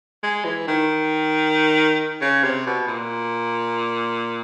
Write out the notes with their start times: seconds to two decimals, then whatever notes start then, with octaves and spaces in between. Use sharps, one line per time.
0.23 G#3
0.44 E3
0.68 D#3
2.22 C#3
2.44 C3
2.67 B2
2.88 A#2